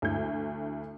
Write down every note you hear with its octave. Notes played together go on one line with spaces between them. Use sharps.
D2 E4 G6